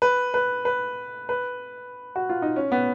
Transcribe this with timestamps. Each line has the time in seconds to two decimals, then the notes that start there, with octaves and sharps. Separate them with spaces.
0.02 B4
0.34 B4
0.65 B4
1.29 B4
2.16 F#4
2.29 F4
2.42 D#4
2.56 C#4
2.72 B3